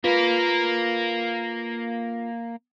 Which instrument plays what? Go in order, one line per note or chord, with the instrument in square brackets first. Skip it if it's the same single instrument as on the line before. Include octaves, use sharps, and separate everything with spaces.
[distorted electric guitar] A#3 A#4 [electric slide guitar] F4 B4